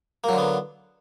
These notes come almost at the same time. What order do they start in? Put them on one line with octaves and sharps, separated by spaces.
A#3 F#3 D3 B3